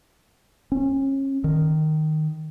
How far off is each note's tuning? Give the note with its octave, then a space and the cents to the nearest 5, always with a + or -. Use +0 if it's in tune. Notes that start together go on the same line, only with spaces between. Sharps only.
C#4 -30
D#3 -5